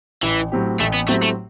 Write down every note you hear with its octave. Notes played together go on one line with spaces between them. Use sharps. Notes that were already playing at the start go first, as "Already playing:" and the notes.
A1 E3
A2 F#3 C4 G4
A1 A3
B3
A2 F#3 A3 C4 G4
A3